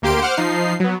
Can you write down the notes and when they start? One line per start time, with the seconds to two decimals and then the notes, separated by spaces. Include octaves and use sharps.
0.02 D2 A#3 G4 C6 D7
0.22 C5 F#5 D6 F6
0.37 F3 D#4 C7
0.80 F#3 B3